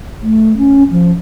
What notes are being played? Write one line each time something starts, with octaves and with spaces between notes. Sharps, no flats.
A3
C#4
F3